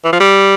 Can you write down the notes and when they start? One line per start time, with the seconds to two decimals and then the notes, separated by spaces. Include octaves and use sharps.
0.04 E3
0.12 F3
0.20 G3